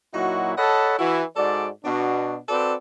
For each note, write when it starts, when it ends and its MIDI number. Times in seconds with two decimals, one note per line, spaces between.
0.14 0.53 46
0.14 0.53 54
0.14 0.53 63
0.14 0.53 64
0.14 0.53 66
0.57 0.96 69
0.57 0.96 73
0.57 0.96 75
0.57 0.96 78
0.57 0.96 81
0.57 0.96 83
0.98 1.23 52
0.98 1.23 64
0.98 1.23 66
1.36 1.69 44
1.36 1.69 66
1.36 1.69 69
1.36 1.69 74
1.85 2.37 47
1.85 2.37 62
1.85 2.37 66
2.49 2.75 60
2.49 2.75 66
2.49 2.75 69
2.49 2.75 71
2.49 2.75 74